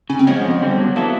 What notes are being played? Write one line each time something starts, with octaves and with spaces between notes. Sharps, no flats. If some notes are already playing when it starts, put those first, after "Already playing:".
C#3 C#4
C4
F3 G#3 B3 C#4
F2
D3 G3 C4
F#3
A#3 B3 E4 A4